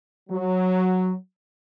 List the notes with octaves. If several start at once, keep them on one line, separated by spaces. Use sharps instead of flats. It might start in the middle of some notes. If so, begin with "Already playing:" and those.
F#3